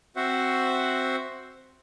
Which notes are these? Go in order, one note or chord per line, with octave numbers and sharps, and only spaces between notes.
C4 F#4 C5 E5 F#5